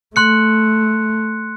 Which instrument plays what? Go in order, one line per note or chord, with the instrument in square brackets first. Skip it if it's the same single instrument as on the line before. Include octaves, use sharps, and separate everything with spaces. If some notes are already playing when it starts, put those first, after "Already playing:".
[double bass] A3 [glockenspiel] C6 F#6 C#7